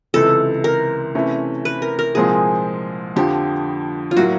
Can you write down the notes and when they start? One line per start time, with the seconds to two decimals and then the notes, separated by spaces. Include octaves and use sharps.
0.14 C#2 C3 E3 A4
0.64 A#4
1.15 C3 E3 A3 C#4 E4
1.65 B4
1.82 A#4
1.99 A#4
2.15 C2 A#2 F3 G#3 C4 G#4
3.16 F2 D3 F3 G4
4.11 F4
4.17 A2 F#3 A#3 F#4